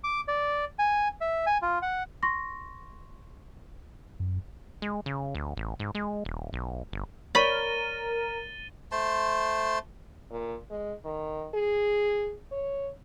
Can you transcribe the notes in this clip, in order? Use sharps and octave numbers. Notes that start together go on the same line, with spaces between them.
D6
D5
G#5
E5
G#5
F4
F#5
C6 C#6 A#6
F#2
G#3
C#3
D2
A1
G#2
G#3
D#1
B1
G1
A#4 C#5 D5 B5 C#6 A6 D#7 G7
A3 C5 A5 C6
A#2
G#3
D#3
G#4
C#5